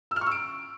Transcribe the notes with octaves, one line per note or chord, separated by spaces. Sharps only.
E6
F6
C#6
E6
D7